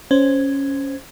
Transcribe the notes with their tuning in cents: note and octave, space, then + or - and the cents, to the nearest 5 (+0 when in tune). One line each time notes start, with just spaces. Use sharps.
C#4 +0 C5 +0